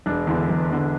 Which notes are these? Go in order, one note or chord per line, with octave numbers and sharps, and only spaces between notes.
E1 D4
E2 D3
E1
E2 D3